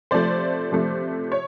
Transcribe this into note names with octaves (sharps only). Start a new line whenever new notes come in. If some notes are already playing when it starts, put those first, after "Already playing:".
C3 F3 A3 C5 D5
C3 F3 A3
C#5